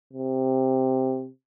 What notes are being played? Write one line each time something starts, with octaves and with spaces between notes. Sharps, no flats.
C3